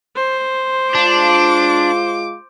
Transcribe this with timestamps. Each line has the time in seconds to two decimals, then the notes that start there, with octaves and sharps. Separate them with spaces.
0.16 C5
0.95 G#3 D4 F4 D6